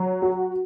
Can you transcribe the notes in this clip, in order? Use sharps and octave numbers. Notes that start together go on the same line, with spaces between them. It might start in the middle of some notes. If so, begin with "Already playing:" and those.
Already playing: F#3
F#4